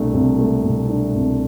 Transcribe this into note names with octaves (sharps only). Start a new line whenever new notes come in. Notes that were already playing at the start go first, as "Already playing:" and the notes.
Already playing: C2 B2 A3 D4
C2
A3
B2
D4
C2